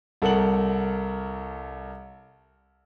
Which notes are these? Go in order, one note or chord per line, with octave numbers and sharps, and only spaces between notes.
C2 A4 A#4 F#5 F#7